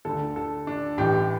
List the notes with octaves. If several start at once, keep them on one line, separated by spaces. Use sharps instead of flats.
D2 D3 A4
A4
D4
A1 A2 E3 G4